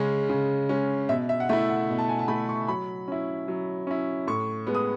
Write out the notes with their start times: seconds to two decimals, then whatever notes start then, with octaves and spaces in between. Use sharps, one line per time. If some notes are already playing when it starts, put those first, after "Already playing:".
Already playing: C#3 G#3 C#4
0.30 C#3
0.69 G#3 C#4
1.09 B2 E5
1.29 E5
1.40 F#5
1.49 A3 E4 E5
1.69 F#5
1.89 B2
1.99 A5
2.09 G#5
2.19 A5
2.28 A3 E4 B5
2.49 C#6
2.68 F#3 B5
3.08 C#4 E4
3.48 F#3
3.87 C#4 E4
4.28 A2 C#6
4.67 G#3 B3
4.75 D#6